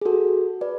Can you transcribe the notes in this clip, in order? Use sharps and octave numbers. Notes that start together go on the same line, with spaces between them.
G#4
F#4 A4
B4 D5